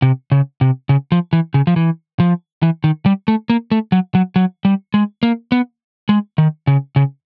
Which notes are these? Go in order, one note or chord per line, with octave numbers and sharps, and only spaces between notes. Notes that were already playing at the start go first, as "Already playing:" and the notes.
C3
C#3
C3
C#3
F3
E3
C#3
F3
E3
F3
E3
D#3
G3
A3
A#3
A3
F#3
F#3
F#3
G3
G#3
A#3
B3
G#3
D#3
C#3
C#3